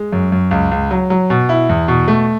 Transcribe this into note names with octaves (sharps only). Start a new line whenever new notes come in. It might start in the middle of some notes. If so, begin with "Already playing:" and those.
Already playing: G#3
F#2
F#2
C#2
C#2
F#3
F#3
B2
E4
E2
B2
A3